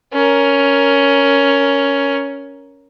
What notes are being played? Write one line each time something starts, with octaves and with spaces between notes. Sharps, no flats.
C#4 A#4